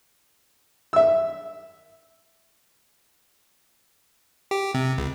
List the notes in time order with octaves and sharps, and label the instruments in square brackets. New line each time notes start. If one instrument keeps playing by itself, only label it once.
[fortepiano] E5 E6
[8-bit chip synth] G4
C3
C#2